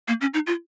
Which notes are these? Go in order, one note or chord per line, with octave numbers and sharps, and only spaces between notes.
A#3
C#4
D#4
F4